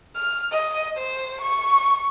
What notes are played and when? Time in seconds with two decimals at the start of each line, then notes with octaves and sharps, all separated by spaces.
0.16 F6
0.52 D#5
0.98 C5
1.42 C#6